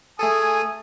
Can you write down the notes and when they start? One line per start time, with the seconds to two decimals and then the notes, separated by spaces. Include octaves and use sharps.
0.19 A3 G#4 A4 G#5 D#6